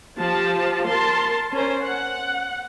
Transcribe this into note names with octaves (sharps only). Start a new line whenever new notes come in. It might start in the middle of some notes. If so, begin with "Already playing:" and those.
F3 G4 A5
A#4 A5 C6
C#4 A#4 C5
F#5